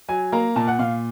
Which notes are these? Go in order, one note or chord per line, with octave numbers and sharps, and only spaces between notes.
F#3 G#5
A#3 A#5
A#2 A5
F#5
A#2 F5